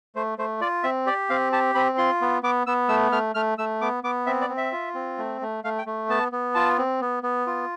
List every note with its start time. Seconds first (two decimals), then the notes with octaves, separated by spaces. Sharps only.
0.15 A3 C5
0.38 A3 C5
0.61 F4 D5
0.83 C4 E5
1.06 G4 D5
1.30 C4 F5
1.52 G4 A5
1.75 C4 B5
1.98 F4 C6
2.21 B3
2.43 B3 D6
2.67 B3 E6
2.89 A3 E6
3.12 A3 F6
3.35 A3 F6
3.58 A3 E6
3.81 B3 D6
4.04 B3 D6
4.26 C4 E5
4.41 D5
4.49 C4
4.57 E5
4.72 F4
4.95 C4
5.18 A3
5.41 A3
5.64 A3 F5
5.79 G5
5.86 A3
6.09 B3 A5
6.32 B3
6.55 F4 A5
6.78 C4
7.01 B3
7.23 B3
7.47 F4